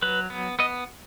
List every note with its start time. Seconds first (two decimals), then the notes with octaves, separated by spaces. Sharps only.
0.02 F#3 B4
0.30 B3
0.59 B3 D#5